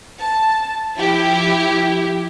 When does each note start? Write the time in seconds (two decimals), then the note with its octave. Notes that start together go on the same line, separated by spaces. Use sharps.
0.20 A5
0.98 F3 E4 G4